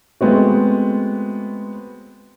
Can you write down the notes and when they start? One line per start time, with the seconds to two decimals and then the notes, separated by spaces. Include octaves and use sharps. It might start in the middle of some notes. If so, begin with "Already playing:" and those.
0.21 G#3 A3 B3 C4 F#4